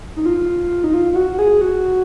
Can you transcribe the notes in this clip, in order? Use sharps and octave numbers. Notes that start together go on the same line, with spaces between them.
D#4
F4
D#4
F4
F4
F#4
F#4
G#4
F#4